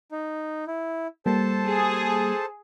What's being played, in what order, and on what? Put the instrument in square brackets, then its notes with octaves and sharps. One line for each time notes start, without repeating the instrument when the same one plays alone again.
[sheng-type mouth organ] D#4
E4
[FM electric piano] G3 A#3 G4 [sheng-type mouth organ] A4 C5 A5
[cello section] G#4